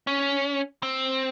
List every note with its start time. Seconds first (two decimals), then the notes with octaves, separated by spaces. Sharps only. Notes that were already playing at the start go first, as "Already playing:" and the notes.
0.07 C#4
0.83 C4